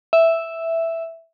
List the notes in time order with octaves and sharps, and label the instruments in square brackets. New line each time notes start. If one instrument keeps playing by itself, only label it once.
[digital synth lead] E5